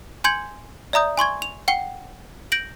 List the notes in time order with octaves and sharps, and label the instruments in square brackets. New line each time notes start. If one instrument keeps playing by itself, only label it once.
[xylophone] G#5 C6 G6 G#6 C#7 F#7
D5 E5 A#5 D#6 G6
G#5 C6 C#6 G#6
F7
F#5 G5 C7 G7
G6 A#6 D7 F#7